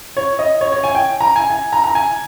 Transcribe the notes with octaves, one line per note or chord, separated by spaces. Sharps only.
C#5
D#5
C#5
C#5
G#5
G5
A#5
G#5
G#5
A#5
A#5
G#5